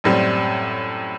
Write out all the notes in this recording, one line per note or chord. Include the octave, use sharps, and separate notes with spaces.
F#2 A2 G3 C4